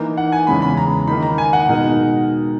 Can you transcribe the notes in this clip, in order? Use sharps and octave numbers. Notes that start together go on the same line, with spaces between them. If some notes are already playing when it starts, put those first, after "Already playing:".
Already playing: E3 A#3 D#4
F#5
G#5
E2 C#3 E3 G#3 C#4 B5
B5
A#5
D#3 A#3 D#4 B5
A#5
G#5
F#5
B2 G#3 D#4 A#4